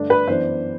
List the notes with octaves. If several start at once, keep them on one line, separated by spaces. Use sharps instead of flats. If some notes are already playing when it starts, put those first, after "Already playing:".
Already playing: G2 D3 A3 D4
B4
F#2 E3 B3 D4 C5